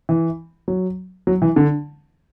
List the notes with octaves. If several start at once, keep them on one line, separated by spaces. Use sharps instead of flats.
E3
F#3
F#3
E3
D3